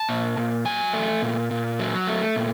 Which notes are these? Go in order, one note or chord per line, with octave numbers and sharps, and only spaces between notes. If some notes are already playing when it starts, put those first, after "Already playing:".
Already playing: A5
A#2
A#2
F#3 G#5
A3
A#2
A#2
F#3
A3
A#2